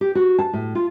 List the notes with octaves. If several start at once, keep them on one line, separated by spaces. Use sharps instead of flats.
G4
F#4
A5
A2
F4